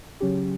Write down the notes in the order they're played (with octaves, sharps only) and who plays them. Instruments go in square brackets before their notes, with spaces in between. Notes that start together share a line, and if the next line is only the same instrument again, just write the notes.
[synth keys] C#3 F#3 C#4 G4